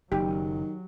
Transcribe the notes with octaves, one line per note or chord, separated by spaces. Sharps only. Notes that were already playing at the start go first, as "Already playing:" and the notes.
F#1 D#3 F#3 G4